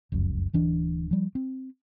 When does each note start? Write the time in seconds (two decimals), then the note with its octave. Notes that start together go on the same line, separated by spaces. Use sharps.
0.12 F1 C#2 F#2
0.53 D1 E3 D4
1.11 F3 G3
1.35 C4